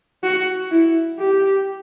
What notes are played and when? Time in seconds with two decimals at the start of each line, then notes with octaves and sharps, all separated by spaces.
0.24 F#4
0.71 E4
1.19 G4